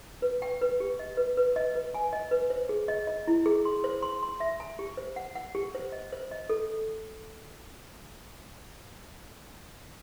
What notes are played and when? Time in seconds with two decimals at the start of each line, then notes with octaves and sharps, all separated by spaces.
0.22 B4
0.42 G5
0.61 B4
0.80 G4
0.99 D#5
1.17 B4
1.37 B4
1.56 D#5
1.75 B4
1.94 G#5
2.13 D#5
2.31 B4
2.50 C5
2.69 G#4
2.88 D#5
3.07 D#5
3.27 E4
3.46 G#4
3.65 C6
3.84 C5
4.02 C6
4.23 C6
4.40 E5
4.60 A5
4.79 G4
4.97 C5
5.16 F#5
5.35 F#5
5.55 G4
5.75 C5
5.92 D#5
6.13 C5
6.31 D#5
6.50 A4